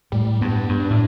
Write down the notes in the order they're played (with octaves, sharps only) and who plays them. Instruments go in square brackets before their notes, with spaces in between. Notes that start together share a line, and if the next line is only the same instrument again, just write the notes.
[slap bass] A2 [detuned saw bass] G3
[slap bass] G2 [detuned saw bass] B3
[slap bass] G2 [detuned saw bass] D4
[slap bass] A2